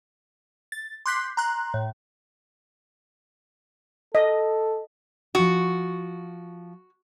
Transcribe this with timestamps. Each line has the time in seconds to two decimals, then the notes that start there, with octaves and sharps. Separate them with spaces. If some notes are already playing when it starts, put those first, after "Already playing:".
0.72 A6
1.06 C6 D6 F#6 G6 B6 C7
1.37 A#5 C6 F#6
1.74 A2
4.15 A4 D#5
5.35 F3 F4 F#4